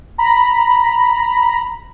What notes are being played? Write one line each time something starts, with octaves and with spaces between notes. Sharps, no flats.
A#5 B5